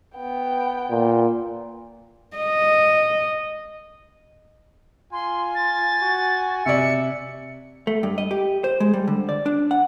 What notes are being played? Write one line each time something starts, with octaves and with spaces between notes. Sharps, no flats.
B3 G5
A#2
D#5
F4 G#5 C6
A6
F#4
C3 D5 E5 C#7
A3
G2
D#5
G4
C5
G#3
G3
D3
D5
D4
F#5